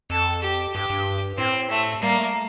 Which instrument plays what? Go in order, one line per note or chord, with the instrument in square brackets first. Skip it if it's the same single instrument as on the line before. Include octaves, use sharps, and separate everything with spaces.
[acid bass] F2 [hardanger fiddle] A4
[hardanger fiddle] G4
[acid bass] G2 [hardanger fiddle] G4
[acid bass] G2
[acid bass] A2 [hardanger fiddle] C4
[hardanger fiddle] A3
[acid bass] G3 [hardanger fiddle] A#3
[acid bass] A3